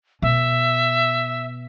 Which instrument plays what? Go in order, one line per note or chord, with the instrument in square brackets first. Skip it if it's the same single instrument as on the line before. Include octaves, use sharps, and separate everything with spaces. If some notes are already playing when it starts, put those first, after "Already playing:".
[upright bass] B2 [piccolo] E5